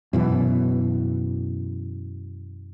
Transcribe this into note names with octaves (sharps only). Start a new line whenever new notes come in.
F#2 B2 E3